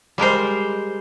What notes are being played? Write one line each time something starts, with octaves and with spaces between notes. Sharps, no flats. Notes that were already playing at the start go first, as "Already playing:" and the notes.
G3 G#3 A#4 C5